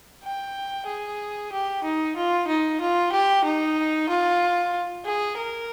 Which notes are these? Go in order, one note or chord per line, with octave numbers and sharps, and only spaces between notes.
G5
G#4
G4
D#4
F4
D#4
F4
G4
D#4
F4
G#4
A#4